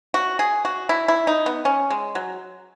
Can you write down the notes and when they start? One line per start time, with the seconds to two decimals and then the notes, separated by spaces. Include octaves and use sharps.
0.14 F#4
0.39 G#4
0.65 F#4
0.89 E4
1.08 E4
1.27 D#4
1.46 B3
1.65 C#4
1.90 G#3
2.15 F#3